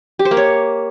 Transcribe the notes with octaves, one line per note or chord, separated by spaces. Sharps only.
G4
C5
A#3
C#5